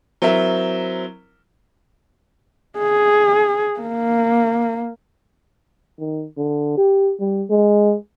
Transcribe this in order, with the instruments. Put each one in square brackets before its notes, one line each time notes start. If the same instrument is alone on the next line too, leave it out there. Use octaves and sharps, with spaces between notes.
[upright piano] F#3 C4 E4 A#4 E5
[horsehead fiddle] G#4
A#3
[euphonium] D#3
D3
G4
G3
G#3